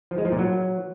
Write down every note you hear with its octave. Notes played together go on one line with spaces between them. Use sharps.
F3
G#3
F3
A#2
F#3